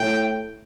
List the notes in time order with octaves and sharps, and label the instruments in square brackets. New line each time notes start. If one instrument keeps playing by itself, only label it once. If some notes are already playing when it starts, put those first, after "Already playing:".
Already playing: [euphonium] A2 [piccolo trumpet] G5